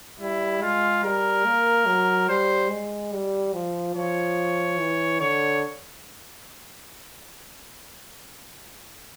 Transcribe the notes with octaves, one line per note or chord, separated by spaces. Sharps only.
G3 E4
G#3 F4
G3 A#4
A#3
F#3
G3 C5
G#3
G3
F3
F3 C#5
E3
D3 C#5